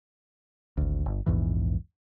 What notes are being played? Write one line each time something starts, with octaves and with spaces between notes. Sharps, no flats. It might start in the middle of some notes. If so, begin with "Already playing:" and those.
G#1 D2
G1
A#1 E2 G#2 E3